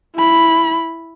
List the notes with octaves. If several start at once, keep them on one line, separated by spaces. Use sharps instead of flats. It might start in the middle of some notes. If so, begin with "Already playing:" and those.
E4 B5